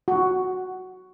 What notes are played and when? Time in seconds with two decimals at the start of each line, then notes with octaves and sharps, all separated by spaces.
0.08 F#4